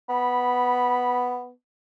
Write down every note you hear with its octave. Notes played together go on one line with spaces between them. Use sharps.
B3 B5